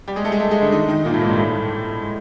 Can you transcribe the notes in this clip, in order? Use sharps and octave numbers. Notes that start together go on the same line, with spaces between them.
G3 G4
G#3 G#4
A3 A4
G#3 G#4
A3 A4
G#3 G#4
D3 D4
D#3 D#4
D#3 D#4
A#2 A#3
A2 A3
G#2 G#3
G2 G3
A2 A3
G#3